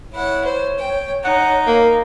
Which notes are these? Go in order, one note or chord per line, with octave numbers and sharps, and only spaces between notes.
E4 C#5 F#5
C5
G5
D#4 F#5
A#3